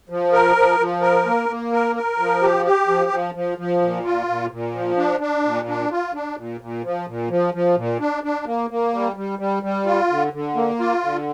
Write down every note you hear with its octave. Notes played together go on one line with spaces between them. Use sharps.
F3
A#4
F3
F3
A#4
A#3
A#3
A#4
A#4
F3
G4
G4
F3
F3
F3
F3
A#2
F4
A#2
A#2
F3
D4
D4
A#2
D4
F4
D4
A#2
A#2
F3
A#2
F3
F3
A#2
D4
D4
A#3
A#3
G3
G3
G3
G3
F4
D3
D3
A#3
F4
D3